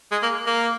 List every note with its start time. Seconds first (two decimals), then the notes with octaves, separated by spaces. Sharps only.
0.12 G#3
0.23 A#3
0.47 A#3